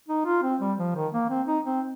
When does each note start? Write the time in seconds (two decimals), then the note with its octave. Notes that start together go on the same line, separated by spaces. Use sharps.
0.08 D#4
0.26 F4
0.43 C4
0.60 G3
0.78 F3
0.95 D#3
1.13 A#3
1.30 C4
1.47 D#4
1.64 C4